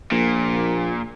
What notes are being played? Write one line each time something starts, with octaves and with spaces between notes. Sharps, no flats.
A#1 A#2